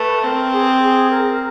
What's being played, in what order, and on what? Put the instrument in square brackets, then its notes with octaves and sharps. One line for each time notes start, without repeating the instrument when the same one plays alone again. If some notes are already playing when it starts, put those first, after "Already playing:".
Already playing: [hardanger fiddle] A3 [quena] B4
[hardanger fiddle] C4 [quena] A#4
[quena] G#4
G#4
A#4